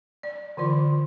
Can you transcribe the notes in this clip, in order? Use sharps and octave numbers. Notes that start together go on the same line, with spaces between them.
D5
D3 E3 F4 D5